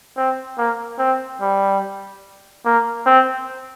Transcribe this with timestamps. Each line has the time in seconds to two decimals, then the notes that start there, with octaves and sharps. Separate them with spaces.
0.17 C4
0.58 A#3
0.99 C4
1.41 G3
2.65 A#3
3.06 C4